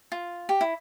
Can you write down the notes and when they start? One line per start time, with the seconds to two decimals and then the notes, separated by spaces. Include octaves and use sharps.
0.12 F4
0.49 G4
0.61 E4